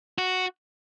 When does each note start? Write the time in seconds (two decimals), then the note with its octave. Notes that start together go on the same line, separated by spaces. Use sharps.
0.18 F#4